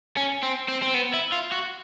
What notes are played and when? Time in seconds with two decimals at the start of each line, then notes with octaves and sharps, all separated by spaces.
0.17 C#4
0.43 C4
0.68 C4
0.82 C4
0.94 B3
1.13 E4
1.32 F4
1.52 F#4